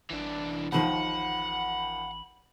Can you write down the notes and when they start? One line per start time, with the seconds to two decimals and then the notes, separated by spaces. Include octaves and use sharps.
0.11 A1 E3 D4
0.72 D#2 D#3 F3 F#5 B5